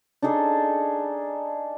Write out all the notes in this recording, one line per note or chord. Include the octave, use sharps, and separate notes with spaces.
D4 D#4 G#4 A4